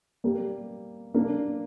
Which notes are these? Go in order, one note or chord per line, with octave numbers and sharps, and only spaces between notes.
G3 A#3
A#3 D4